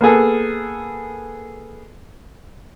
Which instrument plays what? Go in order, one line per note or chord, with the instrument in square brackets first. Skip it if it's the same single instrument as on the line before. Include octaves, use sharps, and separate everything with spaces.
[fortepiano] A#3 B3 G#4 A4